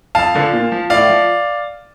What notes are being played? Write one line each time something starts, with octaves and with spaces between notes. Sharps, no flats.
F2 F5 A5
D3 F3
A#2
F3
A2 D5 F5
F3